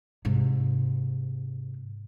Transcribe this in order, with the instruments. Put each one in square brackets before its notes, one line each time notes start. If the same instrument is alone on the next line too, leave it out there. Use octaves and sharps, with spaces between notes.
[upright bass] G#2 C3